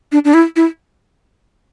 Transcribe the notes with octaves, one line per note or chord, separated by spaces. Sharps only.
D4
D4
E4
E4